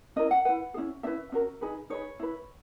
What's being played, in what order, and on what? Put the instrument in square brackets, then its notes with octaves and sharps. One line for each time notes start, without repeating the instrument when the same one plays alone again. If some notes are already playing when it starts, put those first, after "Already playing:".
[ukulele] C#4 E4 A#4 D#5
F#5
E4 B4 F#5
G#4
C#4 E4
C#4 E4 B4 E5
C#4 F#4 A#4
D#4 G#4 B4
D#4 G#4 B4 C#5
E4 B4